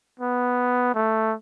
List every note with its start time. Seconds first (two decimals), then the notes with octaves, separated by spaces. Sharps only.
0.20 B3
0.95 A3